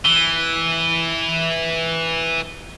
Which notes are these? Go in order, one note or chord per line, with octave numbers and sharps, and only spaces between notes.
E3 G7